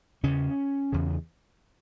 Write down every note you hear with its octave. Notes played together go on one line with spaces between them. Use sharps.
E2 C#3 C#4
E2 C#3